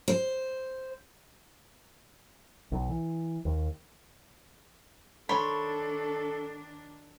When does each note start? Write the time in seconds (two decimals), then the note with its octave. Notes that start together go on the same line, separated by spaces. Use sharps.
0.08 C5
2.72 B1
2.89 E3
3.45 D#2
5.29 D#3 D4 A4 C#5 B5 C6